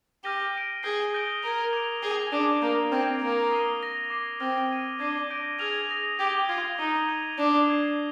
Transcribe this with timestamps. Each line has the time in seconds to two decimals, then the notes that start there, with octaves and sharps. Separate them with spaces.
0.24 G4 F6 A#6 D#7 G7
0.54 F6 A#6 D7
0.83 G#4 G6 C7 D#7 G7
1.13 D#6 G6 A#6 D7 G7
1.43 A#4 G#6 D7 F7
1.73 D6 G#6 D7 F7
2.02 G#4 G6 C7 D#7 G7
2.32 D4 D6 G#6 D7
2.61 A#3 D#6 G6 A#6 D7 F7
2.92 C4 F6 G#6 D7
3.22 A#3 F6 G#6 D7 F7
3.51 D#6 G#6 C7 D#7 G7
3.81 D#6 A#6 F7
4.10 D6 G#6 C7
4.40 C4 F6 G#6 C7 G7
4.70 F6 G#6 D#7 G7
5.00 D4 G#6 C7 D#7 G7
5.30 G6 A#6 D7
5.59 G#4 F6 A#6 F7
5.89 D#6 A#6 F7
6.19 G4 G#6 D7 G7
6.49 F4 G#6 C7 F7
6.79 D#4 D#6 A#6 D#7 G7
7.08 G6 A#6 F7
7.38 D4 G#6 D#7 G7
7.68 D6 F6 G#6 C7